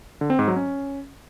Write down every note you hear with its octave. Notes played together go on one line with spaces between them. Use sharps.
D3
C4
G#2
F#3
C#4